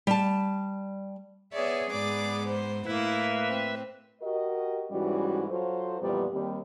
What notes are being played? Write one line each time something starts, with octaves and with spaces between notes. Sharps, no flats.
G3 A5
B3 G#4 C#5 D5 E5
G#2 B3 D5 D6
C5
A2 A#3 E4 B4 E5
C4
F#4 G4 A#4 D#5
G#2 E3 G3 C#4 F#4
F#3 F4 A4 C5
F2 A#2 E3 G3 B3 D5
D#2 G3 C4